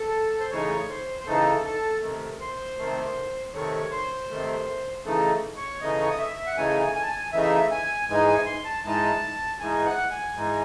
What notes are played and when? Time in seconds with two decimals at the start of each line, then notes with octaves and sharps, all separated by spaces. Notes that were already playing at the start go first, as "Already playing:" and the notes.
Already playing: A4
0.40 C5
0.50 C#3 E3 A3 D#4 C#5
0.89 C5
1.20 C5
1.26 C#3 E3 A3 D#4 A4
1.64 A4
2.02 C3 D#3 A3
2.41 C5
2.78 C3 D#3 A3
3.53 C3 D#3 A3 C#5
3.91 C5
4.30 C3 D#3 A3
5.05 C#3 E3 A3 D#4 A4
5.57 C#5
5.81 C#3 E3 A3 D#4 D#5
6.01 C#5
6.10 D#5
6.19 E5
6.47 F#5
6.57 C#3 E3 A3 D#4 G#5
6.95 G#5
7.02 A5
7.09 G#5
7.33 C#3 E3 A3 D#4 E5
7.71 G#5
8.09 G#2 E3 G#3 D#4 G#5
8.28 G#5
8.46 C6
8.65 A5
8.84 G#2 E3 G#3 D#4 A5
9.60 G#2 E3 G#3 D#4 G#5
9.86 F#5
10.11 G#5
10.36 G#2 E3 G#3 D#4